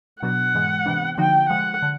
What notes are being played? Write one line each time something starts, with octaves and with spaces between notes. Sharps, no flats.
B2 F#3 B3 D4 F#4 F#5
G#2 E3 G#3
C3 E3 G3 B3 D4
D3 F3 A#3 D#4 F#4 G5
C3 F3 G#3 F#5
D3